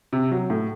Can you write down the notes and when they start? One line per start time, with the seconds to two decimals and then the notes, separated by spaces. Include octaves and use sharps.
0.13 C3
0.32 F#3
0.50 A2